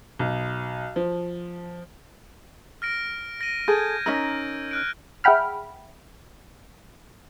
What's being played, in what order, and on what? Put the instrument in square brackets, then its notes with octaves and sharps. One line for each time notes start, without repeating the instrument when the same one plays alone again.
[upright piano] B1
F3
[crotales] F6 A#6 D7
A#6 D#7
[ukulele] G#4 A4 [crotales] G6 G#6
[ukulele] C#4 D#4 A#4 [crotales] E6
[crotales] F6 F#6 D7
[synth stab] G#4 E5 F#5 G5 B5 F6